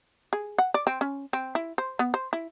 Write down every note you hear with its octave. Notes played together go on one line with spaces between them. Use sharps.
G#4
F#5
D5
C4
C#4
C4
E4
C5
B3
C5
E4